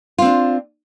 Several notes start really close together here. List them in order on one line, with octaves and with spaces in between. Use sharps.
F4 C4 D4